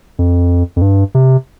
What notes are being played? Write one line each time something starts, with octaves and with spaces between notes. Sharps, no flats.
F2
F2
G2
C3